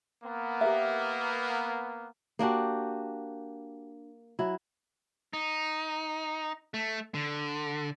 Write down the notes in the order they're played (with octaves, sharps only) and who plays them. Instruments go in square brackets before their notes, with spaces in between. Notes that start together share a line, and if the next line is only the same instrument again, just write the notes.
[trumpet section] A#3 B3
[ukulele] G4 A#4 E5
[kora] A#3 D4 F#4 G4
F#3 E4
[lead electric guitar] D#4
A3
D3